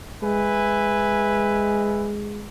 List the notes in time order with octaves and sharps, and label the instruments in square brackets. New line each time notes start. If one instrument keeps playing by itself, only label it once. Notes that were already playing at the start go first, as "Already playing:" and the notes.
[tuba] G#3 [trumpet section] B4 E5 G#5